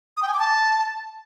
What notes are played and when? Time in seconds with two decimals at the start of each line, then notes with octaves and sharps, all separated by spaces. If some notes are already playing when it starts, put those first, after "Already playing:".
0.17 D#6
0.23 G5
0.28 G#5
0.34 D6
0.39 A5